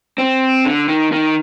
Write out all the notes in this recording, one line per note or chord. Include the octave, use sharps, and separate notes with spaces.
C4
D3
D#3
D#3